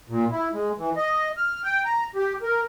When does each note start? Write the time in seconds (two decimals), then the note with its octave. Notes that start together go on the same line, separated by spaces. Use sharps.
0.09 A#2
0.31 E4
0.53 G#3
0.78 E3
0.97 D#5
1.37 F6
1.64 G5
1.85 A#5
2.15 G4
2.42 A#4